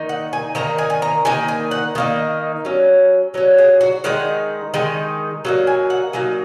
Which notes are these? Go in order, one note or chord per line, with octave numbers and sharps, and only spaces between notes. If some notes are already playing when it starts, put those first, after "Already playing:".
Already playing: D#3 A#3 D#4
F#5
G#5
D#3 A#3 D#4 A#5
G#5
G#5
A#5
D#3 A#3 D#4 G#5
G#5
F#5
D#3 A#3 D#4 D#5
F#3 C#4
F#3 C#4 C#5
G#4
F#4
D#3 G#3 D#4 F#5
D#3 G#3 D#4 G#5
F#3 A#3 D#4
G#5
F#5
F#3 A#3 D#4 G#5